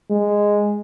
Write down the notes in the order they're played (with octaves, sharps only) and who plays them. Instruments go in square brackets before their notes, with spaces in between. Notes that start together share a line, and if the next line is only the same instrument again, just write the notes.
[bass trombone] G#3